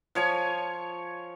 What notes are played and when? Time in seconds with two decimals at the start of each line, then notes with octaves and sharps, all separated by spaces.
0.15 F3 C#5 G#5